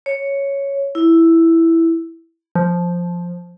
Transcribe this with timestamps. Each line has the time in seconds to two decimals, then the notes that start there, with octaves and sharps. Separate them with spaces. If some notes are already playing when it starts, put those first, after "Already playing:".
0.06 C#5
0.95 E4
2.55 F3